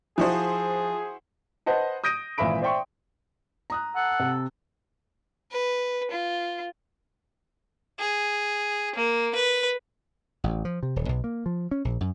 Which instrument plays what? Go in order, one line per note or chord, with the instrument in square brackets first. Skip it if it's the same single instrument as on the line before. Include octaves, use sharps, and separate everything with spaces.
[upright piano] F3 [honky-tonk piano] E4 F#4 C5 [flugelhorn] G#4
[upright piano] B4 C5 D#5 F#5 A5
D#6 G6 A#6 D7 D#7
G#1 A#2 E3 E5 B5 D7
C5 D5 E5 G5 C6 C#6
[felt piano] A#5 D#6 F#6
[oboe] A4 [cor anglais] F#5
[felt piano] C3
[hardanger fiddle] B4
F4
G#4
A#3
B4
[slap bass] A1
F3
C3
D#1
B1
A#3
F3
C#4
A#1
F#2